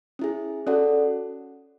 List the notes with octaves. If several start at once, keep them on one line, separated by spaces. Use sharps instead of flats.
C#4 E4 G#4
C#4 F#4 A4 D5 F#5